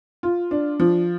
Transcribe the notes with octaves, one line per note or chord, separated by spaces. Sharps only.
F4
D4
F3